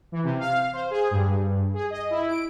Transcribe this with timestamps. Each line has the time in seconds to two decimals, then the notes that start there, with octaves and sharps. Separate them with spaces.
0.12 E3
0.24 C3
0.39 F5
0.73 C5
0.91 G#4
1.11 G2
1.74 G#4
1.90 D#5
2.10 E4
2.28 D7